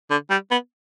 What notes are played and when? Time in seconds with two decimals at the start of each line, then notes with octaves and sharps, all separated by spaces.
0.10 D3
0.30 G3
0.51 B3